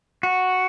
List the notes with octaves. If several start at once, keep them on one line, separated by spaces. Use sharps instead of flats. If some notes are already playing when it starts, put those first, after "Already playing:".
F#4